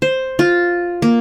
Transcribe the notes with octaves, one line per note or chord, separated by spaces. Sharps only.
C5
F4
A#3